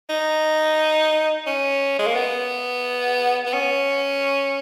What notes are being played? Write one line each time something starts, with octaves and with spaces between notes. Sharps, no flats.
D#4
C#4
G#3
A#3
B3
B3
C#4